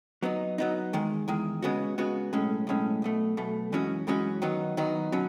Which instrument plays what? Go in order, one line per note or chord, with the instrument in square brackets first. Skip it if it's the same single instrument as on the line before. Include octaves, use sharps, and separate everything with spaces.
[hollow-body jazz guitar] F#3 B3 D#4
F#3 B3 D#4
E2 D#3 G#3
E2 D#3 G#3
C#3 G#3 B3 F#4
C#3 G#3 B3 F#4
B1 A2 G#3 C#4
B1 A2 G#3 C#4
B1 B2 A3
B1 B2 A3
F#2 E3 G#3 C#4 F#4
F#2 E3 G#3 C#4 F#4
D#3 F#3 B3 D#4
D#3 F#3 B3 D#4
B2 F#3 C#4